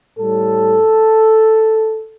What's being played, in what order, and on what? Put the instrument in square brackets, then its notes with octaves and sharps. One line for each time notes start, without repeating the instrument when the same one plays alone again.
[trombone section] A2 G3 A4